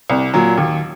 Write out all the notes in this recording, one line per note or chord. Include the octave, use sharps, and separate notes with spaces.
C2
A#2 F#3
D#2